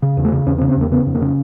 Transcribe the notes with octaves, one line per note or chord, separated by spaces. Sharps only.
C#3
E2
A3
C#3
E2 C#4
C4
C#3
C4
E2 A#3
C#3 B3
F2
A#3
C#3